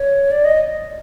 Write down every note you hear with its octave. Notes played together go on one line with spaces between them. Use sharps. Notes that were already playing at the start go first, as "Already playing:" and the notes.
Already playing: C#5
D5
D#5